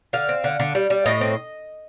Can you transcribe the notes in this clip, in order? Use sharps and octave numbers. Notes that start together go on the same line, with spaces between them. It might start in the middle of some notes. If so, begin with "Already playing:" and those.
D3 F5
C4
D3
D3
G3
G3
A2 D#5
C4